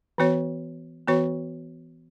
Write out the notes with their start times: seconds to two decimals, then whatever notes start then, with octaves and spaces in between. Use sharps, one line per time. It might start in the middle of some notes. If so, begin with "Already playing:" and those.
0.18 E3 B3 F#4 C#5
1.08 E3 B3 F#4 C#5